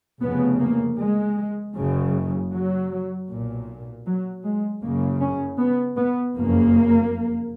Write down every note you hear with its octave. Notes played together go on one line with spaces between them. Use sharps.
F1 F2 C#3 B3
A#3
G#3
F#1 F#2 C#3
F#3
B1 A#2
F#3
G#3
F#1 F#2 C#3 A#3
C#4
B3
B3
F#1 F2 C#3 A#3